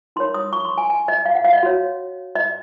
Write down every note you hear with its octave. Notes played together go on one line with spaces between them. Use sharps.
D#4 A#4 C#5 C6
D#6
C#6
C6
G#5
G#5
D#5
F5
F#5
F5
D#5
F#4 C#5
D#5